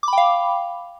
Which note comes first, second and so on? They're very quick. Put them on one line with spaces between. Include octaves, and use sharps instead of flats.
D6 B5 G5 F5